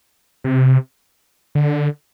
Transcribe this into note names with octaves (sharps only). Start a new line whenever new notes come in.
C3
D3